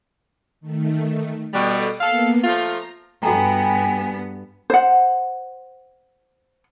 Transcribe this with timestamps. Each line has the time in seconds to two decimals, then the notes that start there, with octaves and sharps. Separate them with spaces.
0.61 D#3 A3
1.54 B2 G3 A4 D5 D#6
2.01 A#3 B3 A4 F5
2.44 F3 A3 F4 A#5
3.23 G2 B3 F#4 A4 G5 G#5 A#5
4.70 C5 F#5